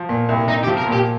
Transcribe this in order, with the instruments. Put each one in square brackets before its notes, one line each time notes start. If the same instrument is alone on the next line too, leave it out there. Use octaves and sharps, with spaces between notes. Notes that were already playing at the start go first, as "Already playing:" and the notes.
Already playing: [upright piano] F3
A#2
C2
[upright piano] C2 [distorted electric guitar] D#4
[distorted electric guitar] G4
[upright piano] F3
[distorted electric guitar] A#4
[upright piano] A#2
[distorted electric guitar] G4